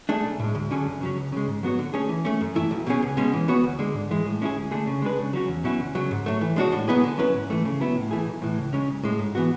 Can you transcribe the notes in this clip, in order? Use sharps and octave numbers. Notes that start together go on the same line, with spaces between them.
A3 D4 G#4
B1
A2 G#3
D2
D3 F#3 C#4 G#4
F#2
C#3 F#3 C#4
C#2
C#3 G#3
G#2
F#3 B3 F#4 C#5
D3
A3 C#4 G#4 C#5
E3
A3 C#4
F#2
E3 A3 E4
B1
B2 F#3 C#4 G#4
C#2
B2 G#3 C#4
E3
B3 F#4 C#5
D2
D3 G#3
G#2
E3 G#3
A2
G#3 C#4 E4 G#4
D2
D3 A3 D4 G#4
C#3
G#3 D4 G#4 B4
C#3
F#3 C#4 F#4
E2
B2 F#3 C#4 E4
D2
C#3 F#3
G#2
F#3 A3
E3
G#3 D4 F#4 C#5
A2
F#3 B3 E4 G#4
D3
F#3 C#4 E4 B4
G#2
E3 A3
C#3
F#3 B3 E4
A2
E3 A3 E4 G#4
B1
A2 E3
C#2
C#3 G#3 C#4
B1
A2 G#3
G#2
E3 B3 F#4